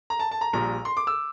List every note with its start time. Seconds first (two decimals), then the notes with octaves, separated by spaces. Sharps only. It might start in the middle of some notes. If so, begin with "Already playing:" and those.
0.10 A#5
0.19 A5
0.31 A5
0.41 A#5
0.53 A#1 A#2 G3 A#5
0.85 C6
0.97 D6
1.07 E6